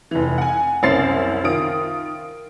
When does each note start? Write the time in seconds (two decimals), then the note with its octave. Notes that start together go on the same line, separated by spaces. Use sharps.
0.11 F1 E3
0.38 F#5 G#5
0.83 F#1 C2 C#4 C5 A6 C7
1.44 D#3 F4 D#6 D7